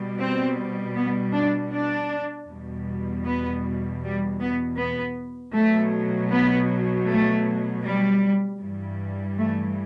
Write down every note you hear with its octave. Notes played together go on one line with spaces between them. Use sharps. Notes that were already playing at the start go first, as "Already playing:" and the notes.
Already playing: B2 G3
C4
B3
D4
D4
E2 B2 G3
B3
G3
B3
B3
B2 F#3 A3
B3
A3
G3
G2 E3 G3
A3